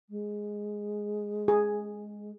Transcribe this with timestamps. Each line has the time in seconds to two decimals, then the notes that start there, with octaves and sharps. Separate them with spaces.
0.10 G#3
1.48 G#4